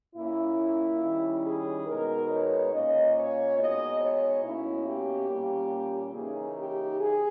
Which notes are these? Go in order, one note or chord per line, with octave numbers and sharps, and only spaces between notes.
A#2 A#3 C#4 E4
D#3 G3 C#4
G#4
B2 G#3 B3 D#4 A#4
C#5
A#2 A#3 C#4 D#5
C#5
B2 G#3 D#4 D#5
C#5
B2 A#3 C#4 E4
G4
A#2 G3 A#3 C#4
C#3 E3 A#3 D#4 G#4
G4
G#4